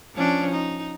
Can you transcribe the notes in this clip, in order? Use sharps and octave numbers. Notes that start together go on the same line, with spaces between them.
F3 C#4 D4
D#4